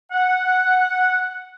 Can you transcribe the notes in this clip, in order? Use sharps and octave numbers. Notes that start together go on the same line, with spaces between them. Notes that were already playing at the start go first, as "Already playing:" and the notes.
F#5